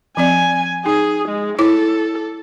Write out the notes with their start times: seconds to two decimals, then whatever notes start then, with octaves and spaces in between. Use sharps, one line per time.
0.17 F3 C4 D5 G#5
0.86 D#4 G#4
1.29 G#3
1.59 E4 A4 C#5 D6